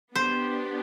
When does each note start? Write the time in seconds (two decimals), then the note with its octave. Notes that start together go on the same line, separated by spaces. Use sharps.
0.15 B3 D4 G4 C5